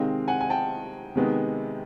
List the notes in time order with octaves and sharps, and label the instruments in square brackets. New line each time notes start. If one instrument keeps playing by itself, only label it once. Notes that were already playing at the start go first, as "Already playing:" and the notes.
Already playing: [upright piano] C3 D#3 G#3 C4 D#5 F5
F#5 G#5
G#5
G5 A5
C3 D#3 G#3 B3